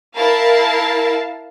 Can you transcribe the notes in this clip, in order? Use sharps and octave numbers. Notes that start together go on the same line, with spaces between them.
E4 A#4 F5 A5